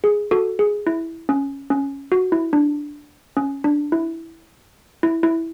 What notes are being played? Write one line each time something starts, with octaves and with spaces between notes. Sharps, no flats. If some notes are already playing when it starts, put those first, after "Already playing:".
G#4
F#4 A4
G#4
E4
C#4
C#4
F#4
E4
D4
C#4
D4
E4
E4
E4